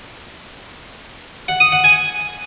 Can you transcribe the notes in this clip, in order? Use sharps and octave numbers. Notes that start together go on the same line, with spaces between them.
F#5
D#6
F#5
G#5